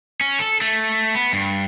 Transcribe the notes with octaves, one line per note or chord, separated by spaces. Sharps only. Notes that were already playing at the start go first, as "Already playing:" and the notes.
C#4
A4
A3
B3
G2